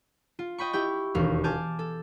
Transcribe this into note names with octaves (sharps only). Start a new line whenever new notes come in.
F4
D#5 G5 B5 C#6
E4 G4 G5
E1 D#2 F5
G#5 A5 D6 F6 G6
A4